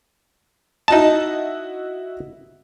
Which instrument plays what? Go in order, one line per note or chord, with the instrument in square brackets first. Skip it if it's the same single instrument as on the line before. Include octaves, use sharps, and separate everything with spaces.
[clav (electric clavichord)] D#4 A5 [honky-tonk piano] E4 F#4 D#5